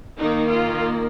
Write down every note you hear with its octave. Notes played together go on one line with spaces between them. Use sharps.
D#3 A#3 D#4
F4